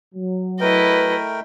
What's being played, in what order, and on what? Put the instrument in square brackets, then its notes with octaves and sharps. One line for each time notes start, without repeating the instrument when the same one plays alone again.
[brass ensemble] F#3
[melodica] A3 A#4 G5 [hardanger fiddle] E4 D#5 [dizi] B4